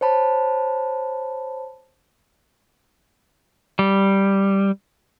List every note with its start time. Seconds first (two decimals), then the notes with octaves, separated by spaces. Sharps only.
0.01 C5 C#5 A5 B5
3.79 G3